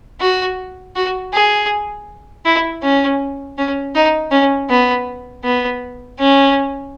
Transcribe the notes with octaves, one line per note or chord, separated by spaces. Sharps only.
F#4
F#4
G#4
E4
C#4
C#4
D#4
C#4
B3
B3
C#4